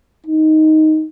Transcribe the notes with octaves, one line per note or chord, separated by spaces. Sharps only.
D#4